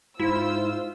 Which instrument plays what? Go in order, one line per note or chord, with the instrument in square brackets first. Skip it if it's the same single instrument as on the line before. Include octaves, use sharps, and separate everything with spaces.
[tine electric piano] G#2 [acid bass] E4 [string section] F4 C5 E6